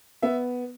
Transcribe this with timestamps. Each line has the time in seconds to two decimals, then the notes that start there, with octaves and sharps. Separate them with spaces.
0.22 B3 E5